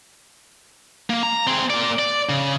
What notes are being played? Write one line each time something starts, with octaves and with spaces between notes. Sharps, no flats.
A#3
A#5
C4 G#4
A#3 D5
D5
C#3